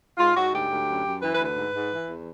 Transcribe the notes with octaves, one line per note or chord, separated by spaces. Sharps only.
G#2 F4
G#2 F#4
D2 G4
D2
F#2
F#2
E3 B4
B4
D2
B4
G#2
G#2
E3
E2